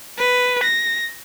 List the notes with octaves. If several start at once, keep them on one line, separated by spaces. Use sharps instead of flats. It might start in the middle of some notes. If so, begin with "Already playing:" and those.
B4
A#6